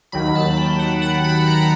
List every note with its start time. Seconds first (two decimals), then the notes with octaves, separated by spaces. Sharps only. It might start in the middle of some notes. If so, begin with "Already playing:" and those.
0.12 D#2 D#3 F#3 B5
0.35 A5
0.57 G5
0.79 F#5
1.02 F#5
1.24 B5
1.47 A#5